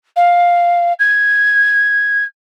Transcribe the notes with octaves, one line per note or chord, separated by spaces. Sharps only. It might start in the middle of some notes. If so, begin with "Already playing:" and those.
F5
G#6